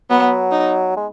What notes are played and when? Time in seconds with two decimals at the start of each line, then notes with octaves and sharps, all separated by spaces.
0.10 F#3 B3
0.51 D#4
0.97 G#3